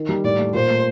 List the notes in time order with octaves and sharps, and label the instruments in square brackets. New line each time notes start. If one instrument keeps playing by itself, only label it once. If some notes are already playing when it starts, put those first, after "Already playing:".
Already playing: [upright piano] D#3
G3
[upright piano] A2 [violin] D5
[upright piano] A3
[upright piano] A#2 [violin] C5
[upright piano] A3